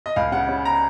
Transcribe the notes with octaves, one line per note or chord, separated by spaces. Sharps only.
D#5
C#2 F5
C#3 F#5
C#3
A#5